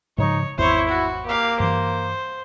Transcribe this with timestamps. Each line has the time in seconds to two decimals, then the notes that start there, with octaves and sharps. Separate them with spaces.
0.18 G#2 C#3 F3 D#4 C#5
0.58 G#1 E2 E4 C5 C#5
0.88 F#4
1.26 A#3 G4 F5
1.60 G2 E3 C5